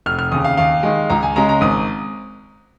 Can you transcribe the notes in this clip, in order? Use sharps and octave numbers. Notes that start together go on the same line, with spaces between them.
F1 F6
F6
D#2 C#3 D#6
F5
D#2 F5
D#3 G#3
C#2 A#5
G#5
C#3 G#3 A#5
A#5
G#1 D#6